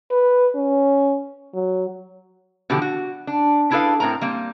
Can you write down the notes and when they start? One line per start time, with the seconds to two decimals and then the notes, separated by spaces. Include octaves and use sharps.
0.11 B4
0.55 C#4
1.54 F#3
2.70 B2 D3 E3 F3 G4
2.82 F#4
3.27 D4
3.71 D4 E4 G#4 A4 B4 F5
4.00 A2 C4 A#4 A#5
4.21 G3 A#3 C4